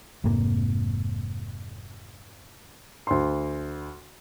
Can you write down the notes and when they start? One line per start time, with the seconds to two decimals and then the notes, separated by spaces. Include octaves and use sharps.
0.24 F1 G#2 C3 A#3
3.07 D2 C6